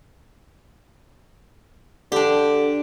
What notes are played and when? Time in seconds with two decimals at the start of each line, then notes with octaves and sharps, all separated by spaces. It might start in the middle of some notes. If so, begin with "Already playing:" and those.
2.12 D3 D4 G4